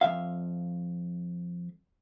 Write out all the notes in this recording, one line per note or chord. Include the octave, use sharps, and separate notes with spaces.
F2 C3 E5 F5